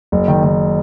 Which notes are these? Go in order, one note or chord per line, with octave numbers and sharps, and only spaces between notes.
F#1
D#3
D#3